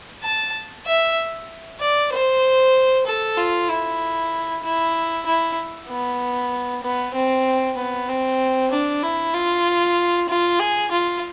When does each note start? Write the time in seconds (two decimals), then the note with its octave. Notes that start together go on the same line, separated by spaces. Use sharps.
0.23 A5
0.86 E5
1.80 D5
2.12 C5
3.07 A4
3.38 F4
3.69 E4
4.63 E4
5.26 E4
5.89 B3
6.83 B3
7.15 C4
7.77 B3
8.09 C4
8.71 D4
9.03 E4
9.34 F4
10.29 F4
10.60 G#4
10.91 F4